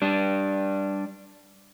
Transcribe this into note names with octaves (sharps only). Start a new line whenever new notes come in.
G3 D4